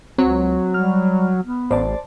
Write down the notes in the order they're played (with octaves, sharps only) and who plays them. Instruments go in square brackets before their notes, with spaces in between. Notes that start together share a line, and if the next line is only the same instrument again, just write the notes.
[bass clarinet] C#2 [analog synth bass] F#3 [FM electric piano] C4
[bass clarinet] G3 [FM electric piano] F6
[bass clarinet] B3
[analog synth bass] A1 [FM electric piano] C5 D5 A5